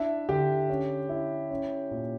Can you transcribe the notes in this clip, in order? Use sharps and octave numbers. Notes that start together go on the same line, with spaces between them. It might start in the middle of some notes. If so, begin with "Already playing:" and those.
Already playing: D4 E4 E5
D3 G4
C#4
E4
C#4
A#2